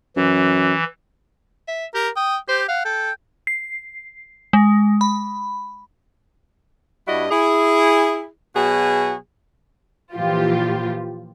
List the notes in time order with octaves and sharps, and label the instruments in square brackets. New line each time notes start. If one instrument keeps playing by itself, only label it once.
[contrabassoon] F#2 [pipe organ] E3
[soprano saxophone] E5
[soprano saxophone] G4 [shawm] A#4
[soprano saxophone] G5 [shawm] D#6
[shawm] G4 [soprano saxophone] C5
[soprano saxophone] F5 [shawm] F#5
[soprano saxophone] A4 [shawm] G5
[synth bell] C7
G#3
B5
[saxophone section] G2 G3 E4 F#4 D#5
E4 G#4
B2 F#3 F#4 G#4
[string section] A#2 E3 F3 F4 G4